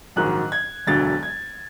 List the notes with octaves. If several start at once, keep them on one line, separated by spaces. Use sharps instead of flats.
A#1 G#2 D#3 F#3 F#6
G#6
E1 D2 D3 F#3 A6
G#6